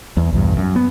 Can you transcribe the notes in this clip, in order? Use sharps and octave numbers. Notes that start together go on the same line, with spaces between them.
E2
B1 E2 G2
F#2
B3